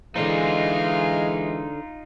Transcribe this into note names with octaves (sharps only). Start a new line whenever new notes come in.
D3 E3 G#3 D#4 F4 C5 F5